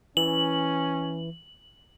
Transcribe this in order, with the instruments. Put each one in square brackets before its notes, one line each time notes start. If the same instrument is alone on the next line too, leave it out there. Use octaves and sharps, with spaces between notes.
[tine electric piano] E3 [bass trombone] C#4 [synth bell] F#7